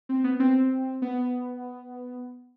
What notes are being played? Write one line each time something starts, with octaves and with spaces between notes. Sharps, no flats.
C4
B3
C4
B3